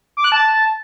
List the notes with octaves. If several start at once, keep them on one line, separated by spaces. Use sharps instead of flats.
D6
F#6
A5